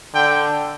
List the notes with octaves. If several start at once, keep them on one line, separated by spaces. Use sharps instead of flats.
D3 G5